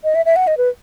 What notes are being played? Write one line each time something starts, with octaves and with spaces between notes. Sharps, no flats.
D#5
E5
E5
F#5
D#5
B4